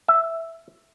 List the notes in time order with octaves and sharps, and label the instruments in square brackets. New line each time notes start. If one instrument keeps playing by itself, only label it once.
[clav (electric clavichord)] E5